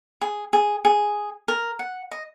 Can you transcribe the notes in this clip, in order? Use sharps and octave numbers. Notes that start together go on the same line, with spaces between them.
G#4
G#4
G#4
A#4
F#5
D#5